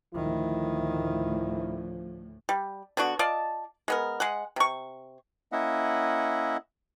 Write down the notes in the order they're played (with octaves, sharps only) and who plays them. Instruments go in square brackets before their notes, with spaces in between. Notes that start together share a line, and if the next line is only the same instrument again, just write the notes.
[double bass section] D2 A2 [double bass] D#3 [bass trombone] F3 [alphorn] E4
[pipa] G3
D3 B3 D4 F#4
F4 D5 D#5 A5
G#3 B3 A#4
G#3 G#4 F#5
C3 C#6
[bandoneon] A#3 C#4 E4 D#5 E5 F#5